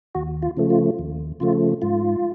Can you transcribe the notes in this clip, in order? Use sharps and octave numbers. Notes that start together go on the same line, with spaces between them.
D#2 F#4
F4
C#3 F3 A3
F4
D#2
C#3 F3 A3 F4
G#2 F4